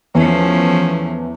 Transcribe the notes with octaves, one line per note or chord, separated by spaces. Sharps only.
E2 F3 A3 C#4